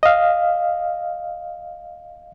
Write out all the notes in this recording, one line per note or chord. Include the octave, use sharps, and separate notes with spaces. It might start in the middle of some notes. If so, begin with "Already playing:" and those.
D#5 F5